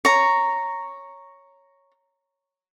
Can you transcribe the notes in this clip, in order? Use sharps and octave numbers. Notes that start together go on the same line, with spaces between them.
C#5 A#5